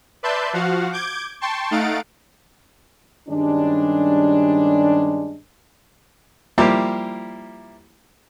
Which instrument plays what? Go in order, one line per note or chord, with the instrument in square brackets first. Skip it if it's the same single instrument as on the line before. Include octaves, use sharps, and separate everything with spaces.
[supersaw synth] B4 D5 E5 A5 C6 G6
F3 F#4 F5 F#5
D6 G6 G#6 D7
G5 A5 C6 C#6
A3 D#4 F5 F#5 A6 D7
[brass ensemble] G2 D#3 G3 G#3 C#4 D4
[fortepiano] F3 G3 A#3 E4 G4 C5